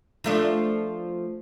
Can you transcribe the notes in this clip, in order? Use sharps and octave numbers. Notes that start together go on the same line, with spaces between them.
F3 A3 D4